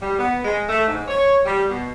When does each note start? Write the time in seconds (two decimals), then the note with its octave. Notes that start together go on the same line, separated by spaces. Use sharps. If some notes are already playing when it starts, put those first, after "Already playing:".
0.02 G3
0.18 B3
0.45 G#3
0.69 A3
0.87 G#2
1.08 C#5
1.46 G3
1.70 B2